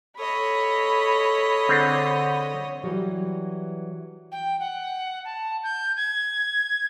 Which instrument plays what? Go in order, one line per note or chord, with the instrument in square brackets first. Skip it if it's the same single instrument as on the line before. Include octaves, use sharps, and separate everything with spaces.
[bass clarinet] A4 [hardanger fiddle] C#5 D#5 [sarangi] B5
[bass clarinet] D3 [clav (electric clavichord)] C4 D4 G#4
[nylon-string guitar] E3 F#3 G3
[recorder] G5
F#5
A5
G6
G#6